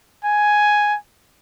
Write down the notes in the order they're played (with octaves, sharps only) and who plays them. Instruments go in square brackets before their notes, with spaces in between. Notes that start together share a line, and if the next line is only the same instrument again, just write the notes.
[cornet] G#5